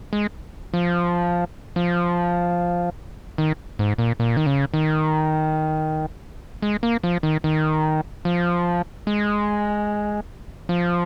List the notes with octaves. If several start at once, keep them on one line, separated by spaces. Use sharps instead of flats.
G#3
F3
F3
D#3
G#2
A#2
A#2
D#3
C#3
D#3
G#3
A#3
F3
D#3
D#3
F3
G#3
F3